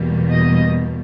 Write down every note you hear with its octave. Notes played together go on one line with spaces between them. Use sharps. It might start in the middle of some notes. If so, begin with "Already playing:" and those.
Already playing: E2 B2 G3 A#3
D#5